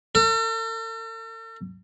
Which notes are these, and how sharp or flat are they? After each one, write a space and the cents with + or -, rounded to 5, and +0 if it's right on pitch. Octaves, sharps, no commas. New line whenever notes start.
A4 +45